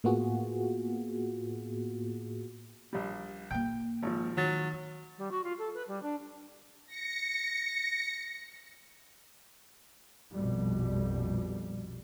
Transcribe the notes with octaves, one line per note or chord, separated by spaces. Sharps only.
A2 A#3 B3 F4 F#4 G#4
A#1 G3
A#2 A#3 G5
G#1 F3
D#3 F#3 A6
G3
F#4
F4
A4
B4
G3
D4
A#6 C#7
A#1 F2 B2 G3